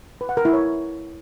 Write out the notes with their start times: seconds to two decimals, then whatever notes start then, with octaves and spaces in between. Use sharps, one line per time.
0.21 B4
0.29 F#5
0.37 A#4
0.45 E4
0.53 C#5